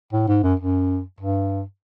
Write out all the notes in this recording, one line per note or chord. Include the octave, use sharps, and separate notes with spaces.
A2
G#2
F#2
F#2
G2